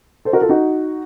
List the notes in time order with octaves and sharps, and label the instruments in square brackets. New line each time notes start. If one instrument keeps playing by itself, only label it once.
[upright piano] A4 C5
F#4 A#4
F4 A4
D#4 F#4